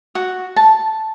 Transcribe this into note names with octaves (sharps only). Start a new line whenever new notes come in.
F#4
A5